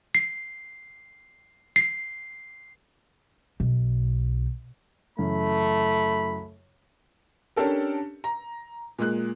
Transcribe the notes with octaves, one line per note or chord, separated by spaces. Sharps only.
C7
C7
B1
F#2 C#3 E3 A3 B5
C#4 D4 G4 A4 A#4
A#5
A#2 G#3 F#6